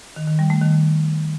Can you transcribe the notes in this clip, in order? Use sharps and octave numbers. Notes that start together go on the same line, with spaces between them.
D#3
D#3
G3
A3
D#3